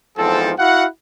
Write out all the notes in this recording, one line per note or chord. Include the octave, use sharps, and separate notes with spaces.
E2 G#2 F3 C4 A4
E4 F#4 F5 F#5